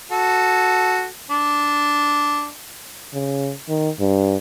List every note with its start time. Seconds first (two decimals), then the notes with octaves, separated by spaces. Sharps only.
0.11 F#4 A4
1.30 D4
3.13 C#3
3.69 D#3
4.00 G2